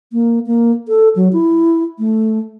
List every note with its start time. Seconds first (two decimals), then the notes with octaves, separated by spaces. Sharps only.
0.13 A#3
0.47 A#3
0.88 A4
1.16 F#3
1.33 E4
1.99 A3